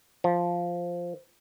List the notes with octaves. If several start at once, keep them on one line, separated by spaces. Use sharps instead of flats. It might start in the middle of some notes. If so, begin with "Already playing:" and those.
F3